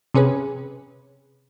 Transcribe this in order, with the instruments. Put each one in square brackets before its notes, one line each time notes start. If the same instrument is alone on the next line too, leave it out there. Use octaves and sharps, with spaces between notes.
[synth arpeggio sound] C3 C#4 G#4 B4